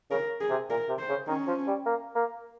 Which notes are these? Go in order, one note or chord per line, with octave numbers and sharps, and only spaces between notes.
C#3 A#4
G#4
C3
A#2 A#4
C3
C5
C#3
D#3 C#4
F3
G3
A#3
A#3